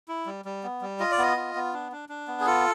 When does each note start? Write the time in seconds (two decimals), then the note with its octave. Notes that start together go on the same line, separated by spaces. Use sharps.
0.08 E4
0.26 G3
0.45 G3
0.64 B3
0.81 G3
1.00 F4 D#5
1.12 D5
1.19 B3 D#5
1.37 F4
1.55 B3
1.73 D4
1.92 D4
2.09 D4
2.28 B3
2.40 G#4
2.46 F4 A4